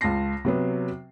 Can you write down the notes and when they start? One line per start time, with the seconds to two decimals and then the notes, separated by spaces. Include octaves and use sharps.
0.01 C#2 F4 A5 A#6 C7
0.45 C3 F#3 B3